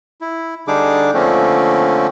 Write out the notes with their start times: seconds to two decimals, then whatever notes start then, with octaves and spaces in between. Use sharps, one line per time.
0.21 E4
0.67 D3 G3 D4 D#4 G#4 D6
1.14 D3 F3 A3 A#3 C4 C#4